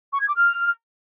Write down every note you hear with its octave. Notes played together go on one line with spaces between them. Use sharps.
C#6
G#6
D6
F6